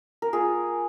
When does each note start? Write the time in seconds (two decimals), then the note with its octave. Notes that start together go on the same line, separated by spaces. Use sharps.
0.22 A#4
0.33 A#3 F4 G#4